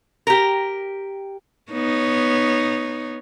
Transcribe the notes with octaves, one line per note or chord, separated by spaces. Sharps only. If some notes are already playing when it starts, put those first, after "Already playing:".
G4 A#4
B3 D#4 C#5